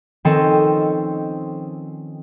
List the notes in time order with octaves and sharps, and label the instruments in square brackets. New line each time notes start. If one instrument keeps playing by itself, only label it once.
[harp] D#3 F3 C4 C#4 A4 D#5